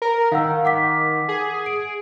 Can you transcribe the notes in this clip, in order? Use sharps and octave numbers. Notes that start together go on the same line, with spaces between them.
A#4
D#3 F5 F#5 E6
F#5 D6 B6
G#4
D7